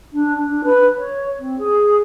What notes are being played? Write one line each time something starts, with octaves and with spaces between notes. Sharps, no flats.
D4
D4
B4
C#5
C4
G#4